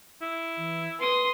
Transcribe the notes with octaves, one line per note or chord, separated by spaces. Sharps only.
E4
E3
B4 C6 D#6